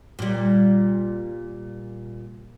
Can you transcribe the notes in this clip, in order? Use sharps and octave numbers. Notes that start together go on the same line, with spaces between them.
A#2 G3